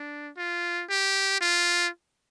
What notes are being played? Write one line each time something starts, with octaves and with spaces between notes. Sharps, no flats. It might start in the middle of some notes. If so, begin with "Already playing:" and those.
Already playing: D4
F4
G4
F4